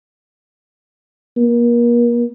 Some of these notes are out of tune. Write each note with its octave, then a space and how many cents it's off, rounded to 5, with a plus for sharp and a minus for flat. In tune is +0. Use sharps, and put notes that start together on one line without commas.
A#3 +35